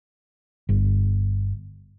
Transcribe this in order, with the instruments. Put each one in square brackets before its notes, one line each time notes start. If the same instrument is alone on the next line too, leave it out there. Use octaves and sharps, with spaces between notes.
[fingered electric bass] G1